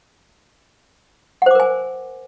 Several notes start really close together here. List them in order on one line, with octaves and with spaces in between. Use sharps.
F#5 C5 D6 A#4 G#5